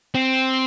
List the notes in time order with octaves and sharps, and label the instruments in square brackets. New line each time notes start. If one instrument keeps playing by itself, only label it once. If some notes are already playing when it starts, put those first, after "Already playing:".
[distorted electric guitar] C4